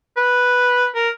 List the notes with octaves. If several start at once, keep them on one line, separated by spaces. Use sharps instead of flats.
B4
A#4